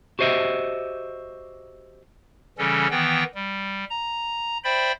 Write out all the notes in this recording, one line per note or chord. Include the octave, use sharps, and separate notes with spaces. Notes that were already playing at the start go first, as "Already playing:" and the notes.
F#4 G4 C5 D#5 E5
C#3 E3 G3 C#4 A4
D#3 E3 B3 G5
G3
A#5
C5 D5 E5 G5 B5